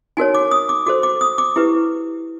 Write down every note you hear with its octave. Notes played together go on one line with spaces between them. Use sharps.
D#4 F#4 A#4 C#5 G#5
D6
D#6
D6
F#4 A4 C5 D6
D6
D#6
D6
E4 G4 B4